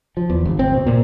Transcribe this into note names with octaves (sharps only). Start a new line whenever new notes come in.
F3
E2
G1
C4
B2
A#2